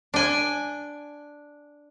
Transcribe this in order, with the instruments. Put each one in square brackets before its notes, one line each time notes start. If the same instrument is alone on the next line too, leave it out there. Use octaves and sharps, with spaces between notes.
[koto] D4 G#5